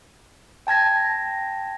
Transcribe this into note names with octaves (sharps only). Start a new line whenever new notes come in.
G5 A5 G#6 A#6